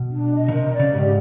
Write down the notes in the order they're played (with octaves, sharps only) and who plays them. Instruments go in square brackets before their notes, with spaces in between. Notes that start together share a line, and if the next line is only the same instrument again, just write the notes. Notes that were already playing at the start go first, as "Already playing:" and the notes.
Already playing: [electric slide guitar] B2
[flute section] D4
D#5
[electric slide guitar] C#3
[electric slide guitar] C3 [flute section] A#4
[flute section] D5
[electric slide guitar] C#3
[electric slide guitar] G#2 [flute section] G4